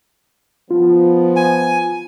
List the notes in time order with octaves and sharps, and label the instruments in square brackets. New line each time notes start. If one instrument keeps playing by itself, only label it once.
[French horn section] F3 B3 [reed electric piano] F4
[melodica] G#5